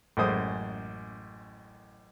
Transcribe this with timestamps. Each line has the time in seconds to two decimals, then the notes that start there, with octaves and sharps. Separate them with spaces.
0.17 A1 F#2 G#3 C5 D#6